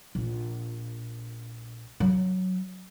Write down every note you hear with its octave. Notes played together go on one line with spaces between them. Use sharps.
A#1
F#3